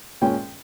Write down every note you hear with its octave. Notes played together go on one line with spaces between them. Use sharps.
A#2 G#3 C#4 G5